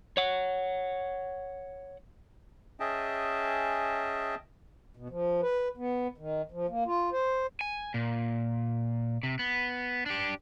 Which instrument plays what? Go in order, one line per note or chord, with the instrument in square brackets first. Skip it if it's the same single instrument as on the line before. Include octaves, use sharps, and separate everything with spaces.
[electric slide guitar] C#5 F#5
[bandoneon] C#4 G#4 D#5 E5 G5 A5
[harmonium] B2
F3
B4
B3
D#3
F3
A#3
F4
C5
[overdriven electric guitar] G#5
A#2
C3
B3
D4 G4